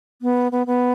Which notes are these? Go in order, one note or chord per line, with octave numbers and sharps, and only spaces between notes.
B3
B3
B3